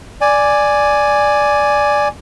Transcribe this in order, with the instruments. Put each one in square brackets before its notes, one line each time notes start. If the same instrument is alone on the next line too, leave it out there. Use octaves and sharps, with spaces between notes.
[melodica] D5 G#5